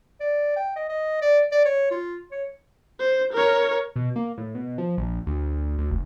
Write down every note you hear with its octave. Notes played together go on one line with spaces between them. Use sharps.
D5
G5
D#5
D#5
D5
D5
C#5
F4
C#5
C5
A#4 C#5
B2
A#3
A2
B2
F3
A#1
D2
D2
F1